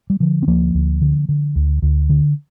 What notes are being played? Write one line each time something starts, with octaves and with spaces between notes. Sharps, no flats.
G3
D3 F3
C4
D2 F3 A#3
D2
D3
D3
D2
D2
D3